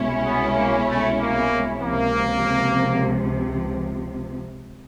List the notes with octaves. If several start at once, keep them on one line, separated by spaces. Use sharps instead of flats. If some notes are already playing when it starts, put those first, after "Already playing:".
Already playing: C2 B2 G#3 C#4 E4
B3
A#3
A3
A#3
C#2 C3 F3 A#3